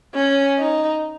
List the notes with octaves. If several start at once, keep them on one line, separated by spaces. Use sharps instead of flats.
C#4
D#4